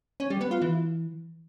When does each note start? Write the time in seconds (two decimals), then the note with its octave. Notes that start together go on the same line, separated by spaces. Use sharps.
0.20 C#4
0.30 G3
0.41 B3
0.51 F4
0.62 E3